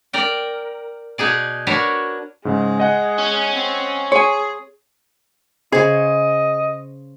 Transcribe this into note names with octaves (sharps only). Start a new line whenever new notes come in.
A#4 D5 G5
B2 D#4 G#4 D5
D4 F#4 A#4 B4 C#5 A5
G#2 C#3 G#3
D#5 F#5 G#5
C#4
C4
G#4 C#5 G#5 C6
C#3 G#4 C5 D#5